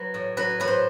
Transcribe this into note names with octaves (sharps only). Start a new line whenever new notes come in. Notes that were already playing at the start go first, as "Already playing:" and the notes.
Already playing: F#3 B4
A2
F#3 B4
A2 B4
C5